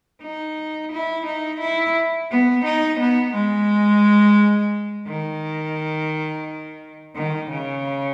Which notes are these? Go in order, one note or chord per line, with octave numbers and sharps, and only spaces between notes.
D#4
E4
D#4
E4
B3
D#4
B3
G#3
D#3
D#3
C#3